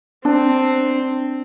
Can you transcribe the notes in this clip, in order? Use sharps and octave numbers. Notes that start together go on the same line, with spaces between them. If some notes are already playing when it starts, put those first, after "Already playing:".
C4 D4